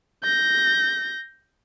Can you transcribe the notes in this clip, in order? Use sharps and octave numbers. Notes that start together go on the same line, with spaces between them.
G6 A#6